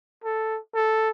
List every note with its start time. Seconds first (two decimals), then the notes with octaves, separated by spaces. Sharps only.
0.24 A4
0.75 A4